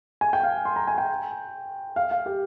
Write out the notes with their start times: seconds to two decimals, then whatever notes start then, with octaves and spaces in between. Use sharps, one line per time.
0.21 G#5
0.33 G5
0.43 F5
0.65 C6
0.76 A#5
0.88 G#5
0.98 G5
1.96 F5
2.11 F5
2.26 G4